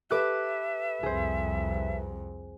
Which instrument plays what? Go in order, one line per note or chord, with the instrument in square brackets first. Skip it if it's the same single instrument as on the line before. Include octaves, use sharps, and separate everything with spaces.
[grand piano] G4 A4 B4 [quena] E5 [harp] D6 F#6
[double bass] C2 F2 [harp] G#4 C5